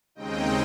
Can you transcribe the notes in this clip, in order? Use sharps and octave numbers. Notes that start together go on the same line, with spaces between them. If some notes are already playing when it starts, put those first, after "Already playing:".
D#2 C#3 G#3 C4 D#4 D#5 G5